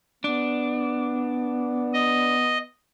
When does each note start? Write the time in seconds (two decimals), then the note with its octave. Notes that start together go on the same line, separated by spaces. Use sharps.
0.24 B3 D4
1.93 D#5